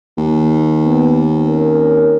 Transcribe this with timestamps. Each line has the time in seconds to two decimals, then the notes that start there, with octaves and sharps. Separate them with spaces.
0.17 D#2
0.84 B3
1.48 C4 C#4 A#4